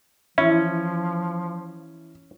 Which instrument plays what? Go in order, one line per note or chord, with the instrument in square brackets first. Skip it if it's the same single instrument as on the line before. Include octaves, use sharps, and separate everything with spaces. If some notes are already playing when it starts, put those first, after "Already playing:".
[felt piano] E3 [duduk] F3 [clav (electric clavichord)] C#4 [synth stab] E4